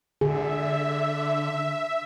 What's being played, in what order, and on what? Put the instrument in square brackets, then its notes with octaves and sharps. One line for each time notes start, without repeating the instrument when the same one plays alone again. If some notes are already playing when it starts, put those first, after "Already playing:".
[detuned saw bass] D3 [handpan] G#4 [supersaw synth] E5